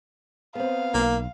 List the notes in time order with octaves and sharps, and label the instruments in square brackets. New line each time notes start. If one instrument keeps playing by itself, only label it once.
[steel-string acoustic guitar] B3 C4 [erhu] F5
[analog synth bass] B1 [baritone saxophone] A#3